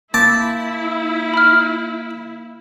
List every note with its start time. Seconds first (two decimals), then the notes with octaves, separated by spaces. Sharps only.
0.14 A#3 E4 A5 D6
1.34 B5 F6